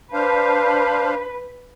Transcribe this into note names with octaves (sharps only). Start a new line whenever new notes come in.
D4 B4 C5 F5